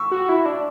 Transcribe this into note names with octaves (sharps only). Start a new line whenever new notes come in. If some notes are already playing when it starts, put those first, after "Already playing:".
Already playing: C#6 E6
F#4
E4
D4